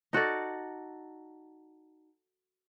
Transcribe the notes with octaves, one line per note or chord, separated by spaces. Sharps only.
D#4 F#4 A4 D5